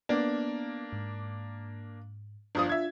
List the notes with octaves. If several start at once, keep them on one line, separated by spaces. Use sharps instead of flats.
A#3 B3 D4
G#2
G1 F3 D4 F4 D#6
E5 G#6